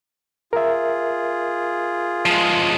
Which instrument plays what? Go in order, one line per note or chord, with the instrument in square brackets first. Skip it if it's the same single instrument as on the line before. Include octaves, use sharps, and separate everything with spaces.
[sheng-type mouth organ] F4 G#4 [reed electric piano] A#4 E5
[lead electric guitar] F3 G#3